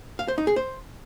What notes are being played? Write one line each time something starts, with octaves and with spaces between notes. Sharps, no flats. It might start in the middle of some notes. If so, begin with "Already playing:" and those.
F5
C5
D#4
G#4
C5